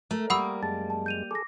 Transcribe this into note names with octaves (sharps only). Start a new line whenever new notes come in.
A3 A#4
G3 A#3 F#5 B5 C#6 D#6 E6
F#2 G#3 A5 A6
A5
G6 D#7 F7
G#4 A4 D6 A#6